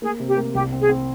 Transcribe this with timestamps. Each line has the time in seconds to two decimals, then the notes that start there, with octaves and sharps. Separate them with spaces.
0.01 A#3 G#4
0.20 C3
0.28 G4
0.37 A#3
0.54 C2 G4
0.72 C4
0.81 G#4
0.89 C4